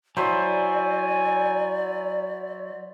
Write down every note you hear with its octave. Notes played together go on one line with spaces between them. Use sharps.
F#3 E4 C5 D5 G#5